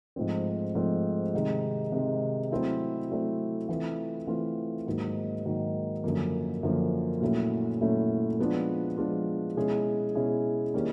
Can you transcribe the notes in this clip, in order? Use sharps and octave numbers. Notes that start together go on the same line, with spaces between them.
G#2 F3 A3 C4
G#2 F3 A3 C4
C3 D#3 G#3
C3 D#3 G#3
F#3 A3 C4 E4 A4
F#3 A3 C4 E4 A4
E3 A3 C4 F4
E3 A3 C4 F4
G#2 D#3 F#3 A#3
G#2 D#3 F#3 A#3
F#2 D3 F3 A#3
F#2 D3 F3 A#3
A#2 F#3 A3 C#4 E4
A#2 F#3 A3 C#4 E4
F3 G#3 B3 D4 F4
F3 G#3 B3 D4 F4
B2 G#3 C#4 E4 G#4
B2 G#3 C#4 E4 G#4
D#3 G3 A#3 C#4 E4